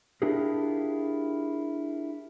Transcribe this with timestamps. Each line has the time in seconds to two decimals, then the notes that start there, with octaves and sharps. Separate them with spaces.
0.22 D4 E4 F4 G4 G#4 A#4